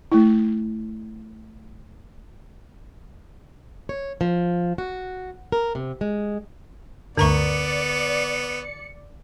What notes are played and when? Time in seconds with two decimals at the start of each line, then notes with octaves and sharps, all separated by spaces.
0.12 A3 E4
3.89 C#5
4.21 F3
4.78 F#4
5.52 A#4
5.75 C3
6.01 G#3
7.17 D2 G2 D3 B3 D5 A#5 C#6 C#7